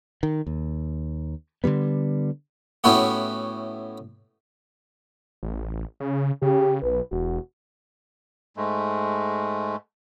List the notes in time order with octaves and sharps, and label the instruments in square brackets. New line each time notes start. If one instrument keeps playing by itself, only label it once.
[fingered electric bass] D#3
D#2
D3 D#3 G3 B3
[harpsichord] A2 B3 C#4 E4 F#4 G4
[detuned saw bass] A1
C#3
[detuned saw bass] C#3 [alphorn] G4
[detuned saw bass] B1 [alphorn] B4
[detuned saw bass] E1 [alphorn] F#4
[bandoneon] G#2 G#3 A3